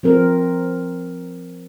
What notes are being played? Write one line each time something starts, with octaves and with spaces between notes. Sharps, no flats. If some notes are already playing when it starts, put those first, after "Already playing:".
F3 C4 A#4